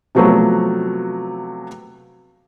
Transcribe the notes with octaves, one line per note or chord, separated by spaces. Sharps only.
C3 F3 F#3 A3 B3 F#4